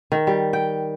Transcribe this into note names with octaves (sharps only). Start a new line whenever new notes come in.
D#3
G3
G5